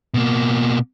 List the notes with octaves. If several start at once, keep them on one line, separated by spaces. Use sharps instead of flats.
B2 A#3